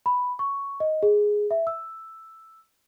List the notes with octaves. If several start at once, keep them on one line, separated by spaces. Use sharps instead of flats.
B5
C#6
D#5
G#4
E5
E6